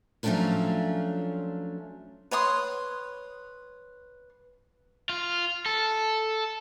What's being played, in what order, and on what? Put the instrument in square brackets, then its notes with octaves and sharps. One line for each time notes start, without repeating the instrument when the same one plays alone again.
[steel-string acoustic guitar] F3 F#3 A3 C#4 D4 F4
[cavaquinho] B4 C#5 C6 D#6
[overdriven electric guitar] F4
A4